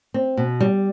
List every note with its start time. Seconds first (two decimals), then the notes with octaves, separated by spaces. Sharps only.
0.14 C4
0.37 B2
0.61 G3